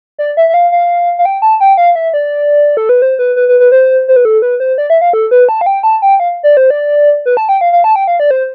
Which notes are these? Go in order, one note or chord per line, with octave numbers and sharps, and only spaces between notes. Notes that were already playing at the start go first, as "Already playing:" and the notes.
D5
E5
E5
F5
F5
F5
G5
A5
G5
F5
E5
D5
A4
B4
C5
B4
B4
B4
B4
C5
C5
B4
A4
B4
C5
D5
E5
F5
A4
B4
A5
F5
G5
A5
G5
F5
D5
C5
D5
B4
A5
G5
F5
F5
A5
G5
F5
D5
C5